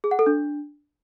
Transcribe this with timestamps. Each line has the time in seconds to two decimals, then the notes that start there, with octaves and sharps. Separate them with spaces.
0.04 G#4
0.11 F#5
0.19 A4
0.26 D4